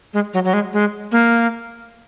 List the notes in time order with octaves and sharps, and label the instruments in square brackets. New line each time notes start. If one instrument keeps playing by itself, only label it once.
[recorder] G#3
F#3
F#3
G#3
G#3
A#3